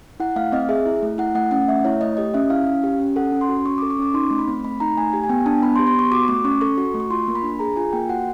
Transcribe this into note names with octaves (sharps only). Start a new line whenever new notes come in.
E4 F#5
A3 F5
C4 D#5
G#4 E5
E4
A3
E4 F#5
A3 F#5
C#4 F#5
A3 E5
E4 C#5
A3 D#5
G4 D#5
C#4 E5
E4 F5
C#4
G4
C#4
A4 F#5
C#4
C6
F#4
C#4 C#6
D6
A4
C#6
C#4 D6
D#4 C6
A3
B5
C4
A3 B5
D#4 A#5
A3 G#5
G4
G#5
B3 G5
D4 A5
B3 B5
C6
G4
C6
B3 C#6
F#4 D6
A3 D6
C#4 C#6
A4 C#6
F#4
A3
C#6
F4 C6
A#3
B5
D4
G#4 A#5
F4 G#5
A#3 G5
F#4 F#5